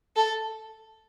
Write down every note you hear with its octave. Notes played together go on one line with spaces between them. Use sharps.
A4